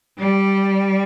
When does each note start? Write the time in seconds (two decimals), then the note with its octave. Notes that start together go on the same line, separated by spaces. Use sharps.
0.19 G3